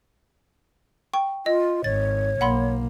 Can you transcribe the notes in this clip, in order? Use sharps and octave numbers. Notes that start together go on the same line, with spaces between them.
G5 C#6
F4 D#5
G#1 C#5 A6
B1 A#3 F#5 B5 C6